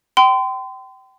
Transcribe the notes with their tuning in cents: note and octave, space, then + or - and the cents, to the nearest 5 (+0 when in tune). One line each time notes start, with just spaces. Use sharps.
G5 -30 C6 -35